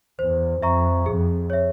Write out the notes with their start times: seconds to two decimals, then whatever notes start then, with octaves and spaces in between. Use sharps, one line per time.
0.19 E2 C5
0.62 F2 E5 A#5 C#6
1.06 F2 G#4
1.50 C#5 E5